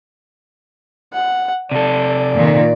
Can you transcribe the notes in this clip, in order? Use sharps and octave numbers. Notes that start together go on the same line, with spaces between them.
F#5
C3 A4 D5
A#2 D#3